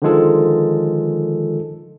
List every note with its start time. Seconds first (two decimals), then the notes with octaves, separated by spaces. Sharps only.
0.02 D3 D#3 F3 G#3 F4 A4